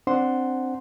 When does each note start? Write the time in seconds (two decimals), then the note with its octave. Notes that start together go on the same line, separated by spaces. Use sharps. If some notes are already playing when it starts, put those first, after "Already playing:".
0.07 C4 D4 C5 F#5 C6